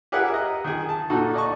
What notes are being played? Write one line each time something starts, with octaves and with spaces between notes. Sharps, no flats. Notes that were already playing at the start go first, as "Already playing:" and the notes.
G4 G#4 A#4 B4 E5 F#5
D#5 A#5
D#3 G#4
A5
D2 A#2 D#4 F#4 A4
D5 D#5 A5 C#6